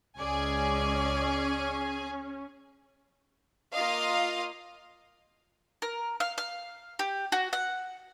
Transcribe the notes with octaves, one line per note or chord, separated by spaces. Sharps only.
C#2 G#3 C#4 G#4 D5 G#5
A#3 F4 D#5 F5
A#4
F5
F5
G4
F#4
F#5